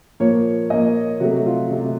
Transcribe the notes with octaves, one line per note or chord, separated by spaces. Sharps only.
A#2 F3 A#3 C#5
A#2 F3 A#3 D#5
C3 F#3 A3 F#4
F4
C3 F#3 A3